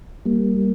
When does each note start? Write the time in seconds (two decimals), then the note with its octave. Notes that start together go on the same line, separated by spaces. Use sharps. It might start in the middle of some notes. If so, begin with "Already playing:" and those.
0.25 G3 A#3